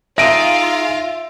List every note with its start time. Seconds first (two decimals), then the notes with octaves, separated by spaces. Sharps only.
0.18 D#4 F4 G#4 E5 F5 A#6 D7 D#7